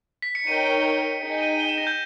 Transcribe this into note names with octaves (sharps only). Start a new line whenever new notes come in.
B6
C#7
D#4 A#4 C#5 G5 D#7
D#4 G#4 D#5 G5 C#7
D#7
G7
E7
A#6
G6